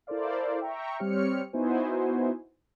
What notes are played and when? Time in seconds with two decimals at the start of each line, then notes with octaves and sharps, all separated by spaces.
0.07 E4 A4 A#4 C5 D5 F5
0.60 E5 G5 A#5 C#6
0.99 G3 C4 G4 C#5 F6 C#7
1.53 B3 D#4 E4 F#4 C5 G#5